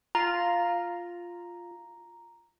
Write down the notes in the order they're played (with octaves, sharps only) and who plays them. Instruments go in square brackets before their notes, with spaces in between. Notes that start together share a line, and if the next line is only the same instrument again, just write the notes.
[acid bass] F4 [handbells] A#5